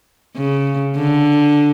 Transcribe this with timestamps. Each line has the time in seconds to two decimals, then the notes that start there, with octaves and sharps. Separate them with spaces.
0.36 C#3
0.97 D3